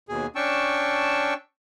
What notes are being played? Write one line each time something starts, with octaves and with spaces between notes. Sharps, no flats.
D#2 B2 G#4
C#4 D4 G5 A5 C#6 E6